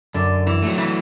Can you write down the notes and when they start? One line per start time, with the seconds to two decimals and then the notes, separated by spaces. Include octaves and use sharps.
0.14 F#2 D3
0.47 E3
0.62 F#3 A3
0.78 E3